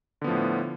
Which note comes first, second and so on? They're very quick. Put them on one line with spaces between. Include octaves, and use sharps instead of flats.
D3 B3 F3 A2